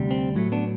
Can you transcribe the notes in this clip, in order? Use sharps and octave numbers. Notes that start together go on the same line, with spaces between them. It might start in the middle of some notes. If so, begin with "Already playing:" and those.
Already playing: D2 C3 G3
C4
A2 F#3 A3
B3 D4